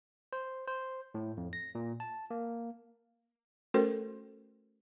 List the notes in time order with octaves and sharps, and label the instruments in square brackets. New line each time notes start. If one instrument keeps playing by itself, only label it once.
[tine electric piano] C5
C5
A2
F2
A#6
A#2
A5
A#3
[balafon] A3 C#4 F#4 A4 A#4 C5